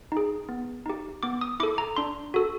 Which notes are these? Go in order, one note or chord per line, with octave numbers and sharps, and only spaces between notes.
D#4 G#4
B3
D#4 G4
B3 D6
D#6
E4 A4 D6
A#5
D4 C6
F#4 A4